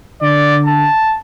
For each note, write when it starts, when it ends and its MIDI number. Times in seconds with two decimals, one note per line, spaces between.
0.22 0.87 50
0.22 0.59 74
0.65 1.16 81